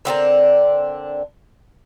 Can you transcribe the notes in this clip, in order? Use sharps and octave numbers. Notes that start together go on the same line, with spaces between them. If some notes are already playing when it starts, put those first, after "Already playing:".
D3 C4 D4 A#4